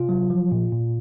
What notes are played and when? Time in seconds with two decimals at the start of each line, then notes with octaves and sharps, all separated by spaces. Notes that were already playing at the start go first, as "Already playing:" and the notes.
Already playing: C3 F4
0.09 F#3
0.30 F3
0.52 A#2
0.72 A#2